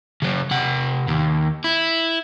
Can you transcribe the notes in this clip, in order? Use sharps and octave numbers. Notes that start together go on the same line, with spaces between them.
C#3 F#3
C3 F#5
D#2
E4